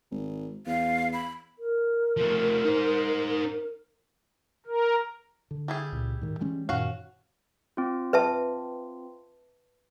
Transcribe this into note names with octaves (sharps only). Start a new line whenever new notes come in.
G#1
E2 F5
B5
A#4
F3 A3
D#4 C5
A#4
D3
G3 E4 G#4
C#2 A#2
G#2 D#3
E3 G#3 C#4
F#2 A#2 D#3 C#4 F#4 F5
C4 F4
B4 E5 A5